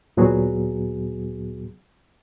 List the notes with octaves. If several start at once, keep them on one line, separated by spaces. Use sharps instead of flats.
D2 A#2 F#3 B3 F#4 G#4